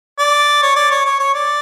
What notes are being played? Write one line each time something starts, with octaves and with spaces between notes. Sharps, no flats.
D5
C#5
D5
C#5
C#5
C#5
D5